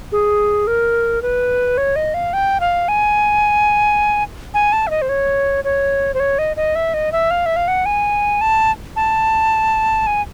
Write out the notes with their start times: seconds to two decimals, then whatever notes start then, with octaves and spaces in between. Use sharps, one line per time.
0.12 G#4
0.67 A#4
1.22 B4
1.78 C#5
1.96 D#5
2.14 F5
2.33 G5
2.60 F5
2.88 G#5
4.54 G#5
4.73 A5
4.87 E5
4.90 D#5
5.02 C5
5.09 C#5
5.64 C#5
6.14 C5
6.20 C#5
6.39 D#5
6.57 D#5
6.75 E5
6.94 D#5
7.12 E5
7.31 F5
7.46 E5
7.56 F5
7.68 F#5
7.86 G#5
8.41 A5
8.96 A5
10.07 G#5